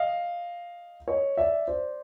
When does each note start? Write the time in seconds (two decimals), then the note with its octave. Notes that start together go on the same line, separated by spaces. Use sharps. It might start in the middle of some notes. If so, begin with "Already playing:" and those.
Already playing: D#5 F5
1.08 C#5 D#5
1.37 D5 E5
1.67 C5 D5